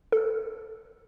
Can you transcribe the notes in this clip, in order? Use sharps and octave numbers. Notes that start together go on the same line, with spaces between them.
A4